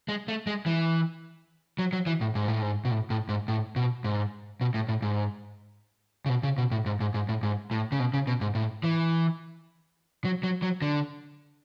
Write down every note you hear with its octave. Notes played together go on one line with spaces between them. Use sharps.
G#3
A3
G#3
E3
F#3
F#3
E3
A2
G#2
A2
G#2
B2
A2
A2
G#2
A2
B2
G#2
B2
A2
A2
G#2
C#3
B2
C#3
B2
A2
G#2
G#2
G#2
A2
G#2
A2
C#3
B2
C#3
B2
G#2
A2
E3
F#3
F#3
F#3
D3